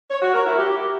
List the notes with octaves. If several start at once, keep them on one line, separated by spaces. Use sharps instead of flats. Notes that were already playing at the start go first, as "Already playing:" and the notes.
C#5
F#4
A#4
E4
G4